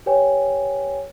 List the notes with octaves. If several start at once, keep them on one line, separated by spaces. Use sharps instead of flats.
G4 B4 C#5 G5 G#5